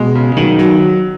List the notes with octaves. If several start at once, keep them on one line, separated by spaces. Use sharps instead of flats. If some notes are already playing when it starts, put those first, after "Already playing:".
Already playing: B2 G#3
C#3
D#3 F#3
F#3